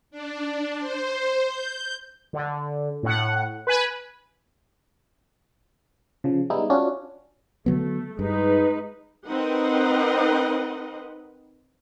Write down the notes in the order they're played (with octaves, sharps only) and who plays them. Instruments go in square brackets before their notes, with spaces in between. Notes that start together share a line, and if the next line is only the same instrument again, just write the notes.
[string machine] D4
C5
G6
[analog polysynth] D3
A2 F#5
B4 G#5
[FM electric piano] C#3 F3
G3 G#3 B3 D#4 E4
C#4 D4 F4 F#4
[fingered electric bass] D3 F#3 B3 [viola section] A3
[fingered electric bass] G2 [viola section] G#3 D#4 B4
[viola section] C4 D#4 A#4 B4 D#5 F#5